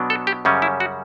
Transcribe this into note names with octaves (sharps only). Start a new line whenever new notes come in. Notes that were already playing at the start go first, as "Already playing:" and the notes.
Already playing: B2 F#3 B3 D4
A4
G4
F#2 C#3 G3 C#4
E4
F#4